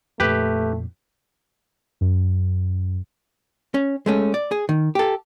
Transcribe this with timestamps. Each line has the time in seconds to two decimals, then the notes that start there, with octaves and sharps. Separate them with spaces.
0.20 F2 A#2 A3 G4 B4
2.01 F#2
3.74 C#4
4.06 G#3 A3 C#4
4.34 D5
4.51 G#4
4.69 D#3
4.95 G4 A4